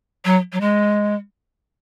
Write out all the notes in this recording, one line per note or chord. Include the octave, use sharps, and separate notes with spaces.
F#3
F#3
G#3